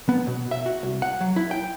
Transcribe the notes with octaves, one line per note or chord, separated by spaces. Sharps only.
B3
B2
E5
F#4
C2
F#5
F#3
E4
G5